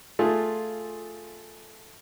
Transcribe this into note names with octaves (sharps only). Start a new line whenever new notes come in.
A3 F4 G#4